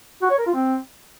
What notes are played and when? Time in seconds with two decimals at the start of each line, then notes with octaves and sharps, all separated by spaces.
0.22 F#4
0.30 C#5
0.38 A#4
0.46 F4
0.54 C4